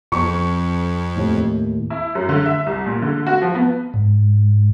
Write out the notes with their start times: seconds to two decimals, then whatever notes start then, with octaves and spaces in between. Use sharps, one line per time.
0.12 F2 C#6
1.16 D#2 A2
1.90 E4
2.15 F#2
2.29 D3
2.46 E5
2.66 C2
2.86 A#2
3.02 D3
3.27 F#4
3.42 F3
3.55 B3
3.94 G#2